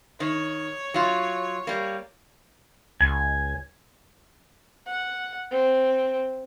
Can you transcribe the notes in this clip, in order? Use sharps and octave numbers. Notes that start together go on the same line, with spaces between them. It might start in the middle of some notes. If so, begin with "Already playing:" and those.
D#3 C#5
F#3 F4
G3 A#3
C#2 G#5
F#5
C4